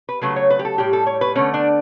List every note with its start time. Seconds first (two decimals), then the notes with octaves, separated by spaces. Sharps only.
0.09 B4
0.21 C#3 F#3 A3 B4
0.36 C#5
0.50 B4
0.59 G4
0.65 A4
0.78 A2 G3 G4
0.93 A4
1.07 C#5
1.21 B4
1.35 D3 A3 C#4
1.54 D4